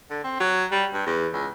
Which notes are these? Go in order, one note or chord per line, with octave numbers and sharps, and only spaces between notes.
D3
C4
F#3
G3
G2
E2
C#2